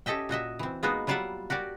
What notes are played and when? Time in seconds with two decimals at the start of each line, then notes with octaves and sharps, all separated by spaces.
0.06 C#4 G4 A4 D#5 E5 G5
0.29 A#2 F#4 D#5 E5
0.59 E3 C4
0.83 G#3 A#3 B3 D#4 F4 F#4
1.07 F#3 G3 F4 D5 E5 F#5
1.50 F#4 G4 A#4 D5